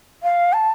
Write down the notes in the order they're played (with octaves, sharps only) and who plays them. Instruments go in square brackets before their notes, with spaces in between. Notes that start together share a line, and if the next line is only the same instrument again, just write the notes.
[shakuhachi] F5
A5